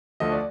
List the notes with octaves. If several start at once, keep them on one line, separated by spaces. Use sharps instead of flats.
D2 D3 F3 A3 D#5
D5